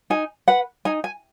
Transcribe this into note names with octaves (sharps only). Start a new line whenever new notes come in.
D#4 G#5
B4 F#5
D#4 G#5
G#5